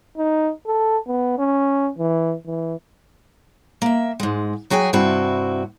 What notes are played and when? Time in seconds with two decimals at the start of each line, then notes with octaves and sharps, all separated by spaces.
0.18 D#4
0.67 A4
1.07 B3
1.39 C#4
1.98 E3
2.46 E3
3.82 A#3 E5
4.20 G#2 G#3
4.70 F#3 F#4 G#4 G5 G#5
4.93 G2 C3 C4 E4 F#4